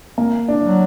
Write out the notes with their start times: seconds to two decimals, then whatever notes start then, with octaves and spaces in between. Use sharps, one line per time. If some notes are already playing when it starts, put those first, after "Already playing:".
0.18 A#3
0.48 D4
0.64 F#3